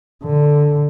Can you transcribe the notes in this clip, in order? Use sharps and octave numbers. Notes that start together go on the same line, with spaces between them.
D3